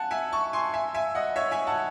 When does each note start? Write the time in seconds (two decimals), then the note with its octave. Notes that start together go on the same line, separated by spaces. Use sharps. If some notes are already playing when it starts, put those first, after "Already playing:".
Already playing: F#5 G#5 A5
0.11 E5 G#5
0.32 A5 C#6
0.53 G#5 C6
0.74 E5 G#5
0.94 E5 G#5
1.15 D#5 F#5
1.36 C#5 E5
1.51 E5 G#5
1.67 F#5 A5